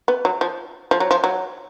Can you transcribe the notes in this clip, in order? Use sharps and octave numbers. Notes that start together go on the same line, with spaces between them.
B3
F#3
F3
F3
F#3
F3
F#3